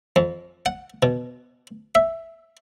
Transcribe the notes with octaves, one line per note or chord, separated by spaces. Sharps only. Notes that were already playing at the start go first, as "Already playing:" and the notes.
F2
F#5
B2
E5